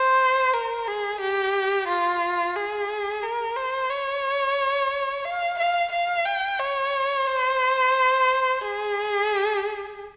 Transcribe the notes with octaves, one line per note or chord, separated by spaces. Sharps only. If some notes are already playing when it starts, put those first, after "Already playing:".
Already playing: C5
A#4
G#4
G4
F4
G#4
A#4
C5
C#5
F5
F5
F5
G5
C#5
C5
G#4